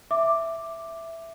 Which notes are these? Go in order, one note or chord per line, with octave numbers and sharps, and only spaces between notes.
E5 D6